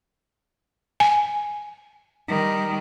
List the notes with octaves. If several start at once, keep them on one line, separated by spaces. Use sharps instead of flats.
G#5
D#3 G3